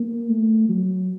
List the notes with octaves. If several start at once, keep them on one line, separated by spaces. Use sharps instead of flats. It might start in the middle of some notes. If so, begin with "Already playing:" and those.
Already playing: A#3
A3
F#3